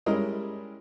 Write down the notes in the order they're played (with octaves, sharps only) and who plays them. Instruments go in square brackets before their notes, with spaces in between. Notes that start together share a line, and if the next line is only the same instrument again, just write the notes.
[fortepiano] G3 G#3 C#4 E4 A#4 D#5